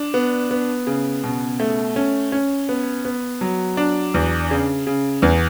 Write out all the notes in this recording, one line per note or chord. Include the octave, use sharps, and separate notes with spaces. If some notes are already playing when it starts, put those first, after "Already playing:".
Already playing: D4
B3
B3
C#3
B2
A3
C#4
C#4
B3
B3
F#3
D4
E2
C#3
C#3
E2